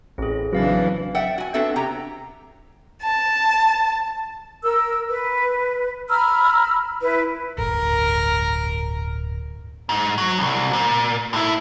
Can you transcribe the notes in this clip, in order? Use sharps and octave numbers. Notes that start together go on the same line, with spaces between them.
A1 C4 G#4
C#3 E3 F#3 C4 D4 B4 F5 A6
D5 E5 F#5 G5
F#4 G#5
B3 C4 D4 F#4 A4 E5
C3 C#4 G4 A#5
A5
A#4 E6
B4
A#5 B5 E6 F6
E4 B4
D1 G1 A#4
G#2
F#3
C2
A#2
A2 E4